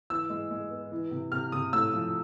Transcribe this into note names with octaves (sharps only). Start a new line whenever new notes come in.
E3 E6
G#3
G#3
B3
E3
C3
C3 F6
C3 D#6
A2 E6
F3